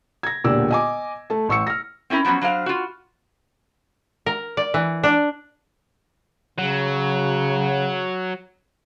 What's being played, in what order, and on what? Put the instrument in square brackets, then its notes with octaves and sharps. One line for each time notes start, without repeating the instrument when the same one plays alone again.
[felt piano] G#6 A#6
E1 A#2 D3 G4 D5 E6
D#5 G#5 D6
A3 A5
A1 C#6 E6 C#7
F6 A#6
[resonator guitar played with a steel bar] C4 C#4 E4 A#4
F3 F#3 B3 C#4 F#4
F#3 D4 C5 F5
F4 F#4
[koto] A#4
D5
E3
D4
[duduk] C#3 [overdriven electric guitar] F#3